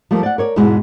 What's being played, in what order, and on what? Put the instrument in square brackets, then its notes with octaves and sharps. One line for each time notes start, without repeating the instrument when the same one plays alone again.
[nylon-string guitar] F3 G3 A3 A#3
D5 F#5
A#4 C#5 D5
E2 G#2 B2 E3 G#3